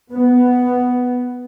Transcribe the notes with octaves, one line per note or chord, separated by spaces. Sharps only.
B3